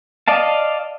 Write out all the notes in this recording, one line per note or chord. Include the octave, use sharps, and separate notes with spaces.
D5 D#5 F5 A5